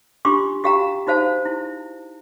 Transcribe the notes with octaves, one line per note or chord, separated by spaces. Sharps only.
D4 F4 G4 C6 D6
F#4 G4 F5 G5 A#5
D#4 F#4 C5 F5 A5
E4